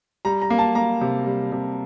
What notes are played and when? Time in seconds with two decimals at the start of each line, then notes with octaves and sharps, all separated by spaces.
0.25 G3 A#5
0.42 A#5
0.50 A#3
0.58 A5
0.75 A#3 A#5
1.01 C3
1.27 G3
1.52 C3